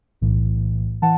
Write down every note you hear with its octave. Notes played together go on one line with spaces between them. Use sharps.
B1 A2 E3
E3 F#5 A5